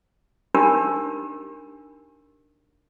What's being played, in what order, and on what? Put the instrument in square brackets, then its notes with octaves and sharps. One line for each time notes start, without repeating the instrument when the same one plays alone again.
[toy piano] D4 D#4 G4 A#4